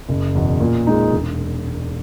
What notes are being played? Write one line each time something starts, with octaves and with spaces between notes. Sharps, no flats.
F#1
E2 B2
A#2
G#3 D#4
E1